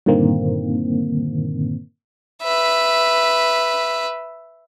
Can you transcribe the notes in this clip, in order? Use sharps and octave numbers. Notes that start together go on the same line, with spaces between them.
G2 A#2 D3 D#3 A#3 C4
B4 E5